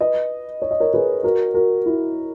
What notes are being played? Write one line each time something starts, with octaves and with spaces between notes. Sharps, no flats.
B4 D#5
C#5
D#5
A#4 C#5
G#4 B4
F#4 A#4
F#4 A#4
E4